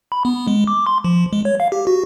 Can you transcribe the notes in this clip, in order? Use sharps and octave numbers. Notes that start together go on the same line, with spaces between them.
B5
B3
G#3
D6
C6
F3
G#3
C#5
F5
G4
F#4